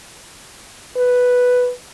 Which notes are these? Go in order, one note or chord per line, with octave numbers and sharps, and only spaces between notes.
B4